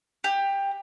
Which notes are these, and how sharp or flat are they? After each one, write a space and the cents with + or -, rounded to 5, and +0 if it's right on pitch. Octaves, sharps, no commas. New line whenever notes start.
G4 +15